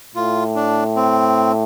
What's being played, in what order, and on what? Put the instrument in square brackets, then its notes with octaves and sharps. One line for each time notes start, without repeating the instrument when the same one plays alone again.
[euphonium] A2 [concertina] F4
[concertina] D4
C4